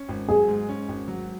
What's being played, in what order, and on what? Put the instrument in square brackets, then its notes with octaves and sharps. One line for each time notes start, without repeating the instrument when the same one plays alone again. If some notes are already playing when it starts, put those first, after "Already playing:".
Already playing: [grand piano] C#4
G#1
[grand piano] F#3 [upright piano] G#4
[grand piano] G#2
C#4
G#1
F#3